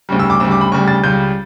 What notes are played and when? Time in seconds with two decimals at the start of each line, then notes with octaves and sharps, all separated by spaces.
0.09 D2 C#3 G3
0.19 E6
0.30 D6
0.40 D2 C#3 G3 E6
0.51 D6
0.61 B5
0.72 D2 C#3 G3 C#6
0.88 A6
1.03 C#2 C#3 G3 G6